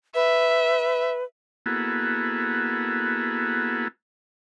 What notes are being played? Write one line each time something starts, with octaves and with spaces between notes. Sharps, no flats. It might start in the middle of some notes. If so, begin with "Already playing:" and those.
B4 E5
A#3 B3 E4 F#4 G#4 A4